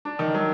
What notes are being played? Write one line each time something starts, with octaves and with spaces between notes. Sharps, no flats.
D4
D#3
F#3